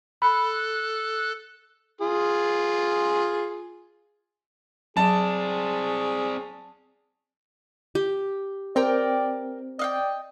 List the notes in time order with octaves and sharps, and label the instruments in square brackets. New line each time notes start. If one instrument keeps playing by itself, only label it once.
[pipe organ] A4 F#6 [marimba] B5
[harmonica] F4 G#4
[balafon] F#3 [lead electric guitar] C4 D5 [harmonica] G#4 [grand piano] A5
[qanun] G4
[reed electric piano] C4 [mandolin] A#4 G5 A#5 [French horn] D5
[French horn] D5 [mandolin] D#5 F5 G5